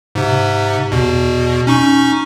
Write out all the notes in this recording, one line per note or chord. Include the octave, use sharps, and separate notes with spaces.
G#2 C3
E2 B2
C#4 D#4 C#6